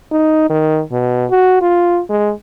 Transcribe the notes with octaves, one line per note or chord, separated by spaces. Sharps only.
D#4
D#3
B2
F#4
F4
G#3